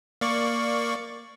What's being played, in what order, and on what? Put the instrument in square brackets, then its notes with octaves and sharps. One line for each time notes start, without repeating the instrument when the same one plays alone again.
[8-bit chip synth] A#3 D5 C#6